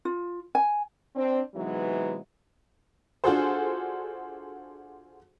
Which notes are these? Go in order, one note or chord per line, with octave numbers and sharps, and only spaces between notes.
F4
G#5
C4 D4
C3 E3 F#3 G#3 B3 D#4
D4 F4 F#4 G#4 A4 C5